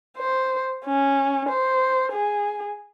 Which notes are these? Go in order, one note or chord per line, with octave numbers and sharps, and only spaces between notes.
C5
C#4
C5
G#4